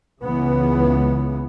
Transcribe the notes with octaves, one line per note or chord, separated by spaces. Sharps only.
C#2 C#3 E3 B3